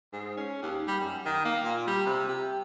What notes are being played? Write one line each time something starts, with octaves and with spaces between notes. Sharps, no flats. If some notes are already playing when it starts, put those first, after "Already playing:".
G#2
C#4
D#2
G3
F#2
D#3
A#3
A#2
G3
C3
G4